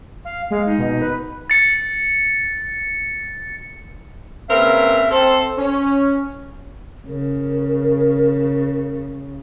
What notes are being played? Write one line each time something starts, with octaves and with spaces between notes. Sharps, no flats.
F5
G#3 F5
D#4
B2
B4
A6 C#7
C#3 A#3 C4 A#4 B4 E5
C4 A4 C5
C#4
C#3 A#4